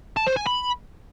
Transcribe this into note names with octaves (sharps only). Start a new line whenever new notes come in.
A5
C5
G#5
B5